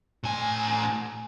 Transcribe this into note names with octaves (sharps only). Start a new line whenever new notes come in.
A2 G#5